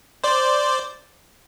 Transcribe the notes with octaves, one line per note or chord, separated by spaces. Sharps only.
C5 D5